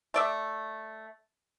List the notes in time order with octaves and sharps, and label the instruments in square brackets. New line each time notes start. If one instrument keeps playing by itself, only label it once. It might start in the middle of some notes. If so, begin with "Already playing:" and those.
[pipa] A3 D5 E5